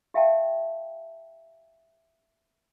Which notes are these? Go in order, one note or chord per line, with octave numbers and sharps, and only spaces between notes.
G4 E5 F5 G5 A5